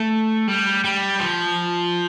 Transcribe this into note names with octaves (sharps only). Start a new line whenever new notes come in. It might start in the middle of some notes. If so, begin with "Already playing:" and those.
Already playing: A3
G3
G3
F3